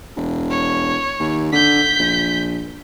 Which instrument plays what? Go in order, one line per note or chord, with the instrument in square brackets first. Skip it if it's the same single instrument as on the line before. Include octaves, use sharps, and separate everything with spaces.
[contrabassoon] E1
[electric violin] C#5
[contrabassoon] D#2
[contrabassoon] D3 [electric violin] G6 B6
[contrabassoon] A#1